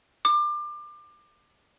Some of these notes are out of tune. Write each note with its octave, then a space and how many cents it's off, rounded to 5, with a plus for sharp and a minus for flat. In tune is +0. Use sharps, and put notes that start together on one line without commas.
D6 +30